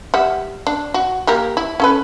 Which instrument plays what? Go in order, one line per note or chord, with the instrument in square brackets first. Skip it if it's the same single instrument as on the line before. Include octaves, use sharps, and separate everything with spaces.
[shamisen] G3 E5 F#5
D4
F#4
A#3 G4 A#4
E4
C#4 A4 B4